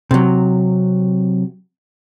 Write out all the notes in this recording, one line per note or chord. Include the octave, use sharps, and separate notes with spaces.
C3 F#3